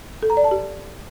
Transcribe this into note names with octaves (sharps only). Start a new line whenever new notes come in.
A4
A#5
D5
A5
G4